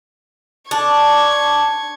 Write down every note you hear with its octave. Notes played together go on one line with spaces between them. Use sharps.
D4 C#6 G#6